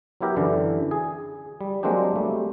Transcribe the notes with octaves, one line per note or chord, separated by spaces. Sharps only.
F#3 B3 E4 G4 A#4
F#2 D3 E3
G#4
G3
F#3 G#3 A#3 C4 D4 G4
G3 A3 A#3